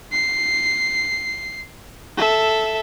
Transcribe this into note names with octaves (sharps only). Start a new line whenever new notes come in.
C7
A4 E5